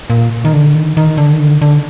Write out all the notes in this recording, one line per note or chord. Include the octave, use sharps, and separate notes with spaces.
A#2
D#3
D3
D#3
D#3
D3
D#3
D3
D3